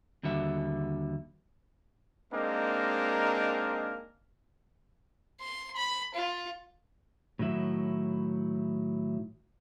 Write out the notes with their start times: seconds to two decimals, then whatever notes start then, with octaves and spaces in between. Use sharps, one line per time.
0.23 D#2 D3 G3 F#4 E5
2.33 G#3 A#3 C4 D4 D#4 A#4
5.41 C6
5.76 B5
6.15 F4
7.39 A2 D#3 F#3 E4